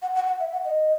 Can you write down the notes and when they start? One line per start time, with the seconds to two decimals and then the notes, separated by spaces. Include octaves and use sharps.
0.02 F#5
0.15 F#5
0.27 F#5
0.40 E5
0.52 F#5
0.65 D#5